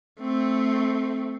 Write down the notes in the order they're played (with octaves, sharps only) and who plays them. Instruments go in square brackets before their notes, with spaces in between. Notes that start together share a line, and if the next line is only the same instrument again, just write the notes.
[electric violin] A3 C4